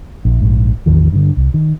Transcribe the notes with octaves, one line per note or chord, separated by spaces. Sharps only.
A#1
A#1 G#2
A1 E2 D#3 F3
G2 D3
C2
D#3